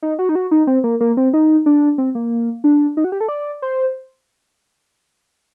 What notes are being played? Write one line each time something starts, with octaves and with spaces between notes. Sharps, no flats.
D#4
F#4
D#4
F#4
D#4
C4
A#3
A#3
C4
D#4
D4
C4
A#3
D4
D#4
F#4
G4
A4
D5
C5